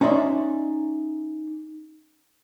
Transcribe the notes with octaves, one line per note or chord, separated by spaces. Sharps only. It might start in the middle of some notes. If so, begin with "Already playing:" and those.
C#4 D#4 D5 E5 C6